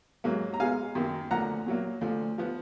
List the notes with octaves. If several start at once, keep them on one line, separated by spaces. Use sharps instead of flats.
G#2 F#3 A#3
A#5
B2 G#3 B3 F5 G#5
F#2 D#3 A#3
D2 D3 F3 A#3 F#5 A#5
A#2 F#3 A#3
D2 D3 F3
F3 B3